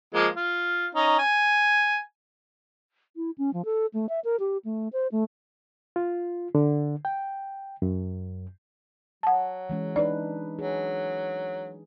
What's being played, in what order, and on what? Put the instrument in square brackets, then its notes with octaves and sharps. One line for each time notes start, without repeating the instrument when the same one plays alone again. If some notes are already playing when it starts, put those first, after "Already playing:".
[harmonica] F3 G#3 A#3
F4
C#4 D#4
G#5
[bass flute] E4
C#4
F3
A4
A3
E5
A#4
G4
A3
C5
A3
[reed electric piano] F4
D3
G5
F#2
[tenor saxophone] F#3 [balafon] F#5 A5
[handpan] E3 G#3 C#4
[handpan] D4 D#4 B4 [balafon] D5
[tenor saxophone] F#3 [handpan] G#4